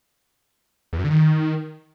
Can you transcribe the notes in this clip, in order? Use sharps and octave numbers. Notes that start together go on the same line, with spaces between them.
E2
F#2
D3
D#3